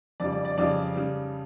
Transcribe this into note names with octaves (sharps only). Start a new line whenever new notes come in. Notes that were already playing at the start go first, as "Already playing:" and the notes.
F2 C#3 G3 D5
D5
D5
F2 C#3 G3 D5
C#3 G3